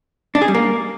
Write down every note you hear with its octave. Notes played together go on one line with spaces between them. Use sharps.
D4
G#4
G3
A#3